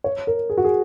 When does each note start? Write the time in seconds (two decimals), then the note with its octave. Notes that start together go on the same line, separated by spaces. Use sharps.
0.04 C#5
0.27 A#4
0.50 G#4
0.57 F#4
0.65 G#4